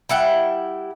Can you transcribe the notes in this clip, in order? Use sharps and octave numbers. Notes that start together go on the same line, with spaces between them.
G3 E4 F#5 G5